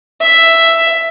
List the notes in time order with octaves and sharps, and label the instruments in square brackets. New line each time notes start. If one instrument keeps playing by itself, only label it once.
[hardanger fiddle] E5